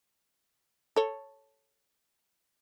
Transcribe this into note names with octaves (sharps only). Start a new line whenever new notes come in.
A4 C#5